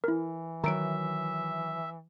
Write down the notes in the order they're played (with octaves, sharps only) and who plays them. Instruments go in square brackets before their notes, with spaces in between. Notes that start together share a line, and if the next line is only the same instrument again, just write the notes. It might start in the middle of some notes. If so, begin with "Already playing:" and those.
[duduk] E3 [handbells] E4 A#4
[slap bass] D#3 F#3 [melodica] E5 [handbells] A#5 D7